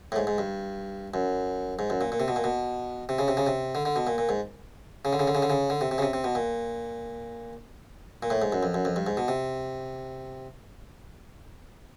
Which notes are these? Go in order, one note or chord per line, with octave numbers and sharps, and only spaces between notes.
A2
G#2
G#2
G2
F#2
G#2
F#2
A#2
A#2
C3
B2
A#2
B2
C3
C#3
C3
C#3
C3
D3
D3
B2
A#2
A#2
G#2
C#3
D3
C#3
D3
C#3
D3
C#3
D3
C3
C3
C#3
C3
C3
B2
A#2
A#2
A2
G#2
F#2
F2
F#2
F2
G2
G#2
B2
C3